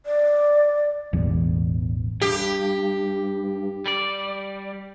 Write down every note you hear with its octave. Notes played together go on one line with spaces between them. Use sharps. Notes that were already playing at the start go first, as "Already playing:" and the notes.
D5
E1 A1 E2
G2 G4
G3 D5